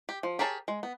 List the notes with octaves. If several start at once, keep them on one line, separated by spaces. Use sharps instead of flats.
G4
F3
G4 G#4 A#4 C#5 A5
G#3
B3